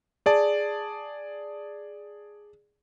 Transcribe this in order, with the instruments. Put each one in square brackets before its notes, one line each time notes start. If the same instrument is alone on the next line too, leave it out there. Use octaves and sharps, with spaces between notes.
[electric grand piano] G#4 D5 A5